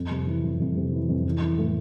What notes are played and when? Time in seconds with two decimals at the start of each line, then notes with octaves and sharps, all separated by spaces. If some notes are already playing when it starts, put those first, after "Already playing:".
Already playing: F2
0.11 C3
0.27 E3
0.44 F2
0.60 F2
0.76 C3
0.93 E3
1.09 F2
1.25 E3
1.41 E3
1.58 A2